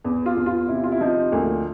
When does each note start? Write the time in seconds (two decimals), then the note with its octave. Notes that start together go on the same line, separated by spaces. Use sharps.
0.04 E2
0.26 F4
0.36 E2
0.46 F4
0.68 C3 E4
0.84 F4
0.92 E4
1.00 F3 D#4
1.32 D2 A#3